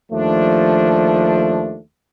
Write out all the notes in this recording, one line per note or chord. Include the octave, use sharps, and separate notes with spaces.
D#2 F3 A3 D4